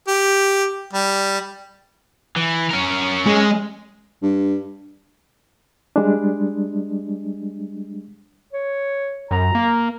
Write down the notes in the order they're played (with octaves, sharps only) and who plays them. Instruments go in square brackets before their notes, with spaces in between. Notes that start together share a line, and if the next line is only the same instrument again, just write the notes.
[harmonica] G4
G3
[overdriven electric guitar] E3
C#4 A#4
[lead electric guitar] G#3
[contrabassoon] G2
[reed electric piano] G3 G#3 D4
[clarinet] C#5
[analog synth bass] F#2 [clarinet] A#5
[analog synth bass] A#3